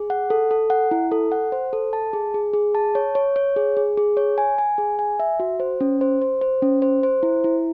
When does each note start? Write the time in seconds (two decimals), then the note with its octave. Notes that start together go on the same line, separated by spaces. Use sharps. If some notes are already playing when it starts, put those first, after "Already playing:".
Already playing: G#4
0.10 F#5
0.30 A4
0.51 A4
0.70 F#5
0.91 E4
1.12 A4
1.32 F#5
1.52 C5
1.73 A4
1.93 A5
2.13 G#4
2.34 G#4
2.53 G#4
2.75 A5
2.95 C#5
3.15 C#5
3.36 C#5
3.56 G#4
3.77 G#4
3.97 G#4
4.17 C#5
4.38 G#5
4.58 G#5
4.78 G#4
4.99 G#5
5.20 E5
5.40 F#4
5.60 C5
5.81 C#4
6.01 C5
6.22 C5
6.41 C5
6.62 C#4
6.82 C5
7.03 C5
7.23 E4
7.44 E4